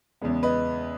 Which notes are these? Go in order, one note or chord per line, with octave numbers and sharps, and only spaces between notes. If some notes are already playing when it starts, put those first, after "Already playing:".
E2 C#3 G#3 B3
B4 D#5